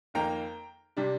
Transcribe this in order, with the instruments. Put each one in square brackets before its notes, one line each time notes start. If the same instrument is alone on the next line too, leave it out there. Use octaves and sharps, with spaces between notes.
[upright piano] F2 D#3 A#3 G5 A#5
C3 G3 D4